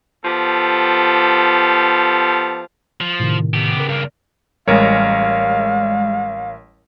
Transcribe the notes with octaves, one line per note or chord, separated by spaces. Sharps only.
F3 B3 G4 A4
F3
A2 C3 D#3
B3 G4
C#3 A#4
G2 A#3
A1 G3 G#3 A#4 C#5 F5